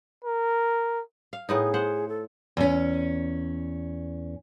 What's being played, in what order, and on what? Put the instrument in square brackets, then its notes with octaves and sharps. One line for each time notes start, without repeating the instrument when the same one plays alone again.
[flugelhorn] A#4
[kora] F5
[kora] A2 B3 D#4 [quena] G#4
[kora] C5 F#5
[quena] A4
[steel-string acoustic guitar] E2 C#4